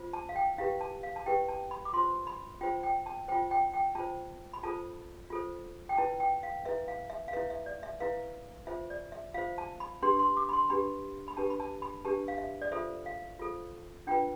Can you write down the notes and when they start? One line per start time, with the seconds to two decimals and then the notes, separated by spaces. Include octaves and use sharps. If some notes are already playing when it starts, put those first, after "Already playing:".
Already playing: F4 C5
0.13 A5
0.29 F5
0.36 G5
0.58 E4 G4 B4 F5
0.81 A5
1.03 F5
1.16 A5
1.26 E4 G4 B4 G5
1.49 A5
1.71 B5
1.85 D6
1.93 F4 C5 C6
2.27 B5
2.61 F4 C5 G5
2.83 G5
3.06 A5
3.28 F4 C5 G5
3.51 G5
3.73 G5
3.95 F4 C5 A5
4.53 B5
4.63 F4 A4 C5 A5
5.30 F4 A4 C5
5.89 G5
5.97 E4 B4 A5
6.20 G5
6.43 F5
6.65 E4 B4 E5
6.88 F5
7.10 E5
7.28 F5
7.33 E4 B4 E5
7.50 E5
7.66 D5
7.83 E5
8.00 E4 B4 F5
8.67 F4 C5 E5
8.90 D5
9.12 E5
9.34 F4 C5 F5
9.58 A5
9.80 B5
10.02 D4 G4 B4 C6
10.19 C6
10.37 D6
10.49 B5
10.53 C6
10.70 D4 G4 B4 B5
11.28 B5
11.37 D4 G4 B4 A5
11.50 B5
11.60 A5
11.82 B5
12.05 D4 G4 B4 A5
12.28 F5
12.38 E5
12.62 D5
12.72 F4 A4 C5 E5
13.06 F5
13.39 F4 A4 C5
14.07 D4 F4 B4 G5